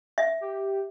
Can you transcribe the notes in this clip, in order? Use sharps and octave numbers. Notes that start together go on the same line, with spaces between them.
E5
G4